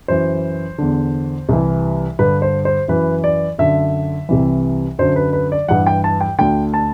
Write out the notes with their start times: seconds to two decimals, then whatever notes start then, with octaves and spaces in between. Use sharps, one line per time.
0.08 F#2 E3 C5
0.78 E2 D3
1.49 C2 C3 E3
2.19 G2 D3 B4
2.42 C5
2.65 C5
2.88 F#2 E3 B4
3.24 D5
3.58 F#2 D3 E5
4.29 C2 C3 E3
4.98 F#2 D3 C5
5.16 B4
5.33 B4
5.52 D5
5.68 G2 E3 F#5
5.87 G5
6.04 A5
6.21 G5
6.38 D2 D3 G5
6.74 A5